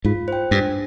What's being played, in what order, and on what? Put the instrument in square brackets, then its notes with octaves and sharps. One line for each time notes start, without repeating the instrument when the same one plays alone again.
[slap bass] G#2 [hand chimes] F4
[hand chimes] C5 G5
[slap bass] G2 [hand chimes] D4